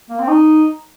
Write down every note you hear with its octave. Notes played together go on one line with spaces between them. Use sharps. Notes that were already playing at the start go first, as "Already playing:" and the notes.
A#3
C4
D#4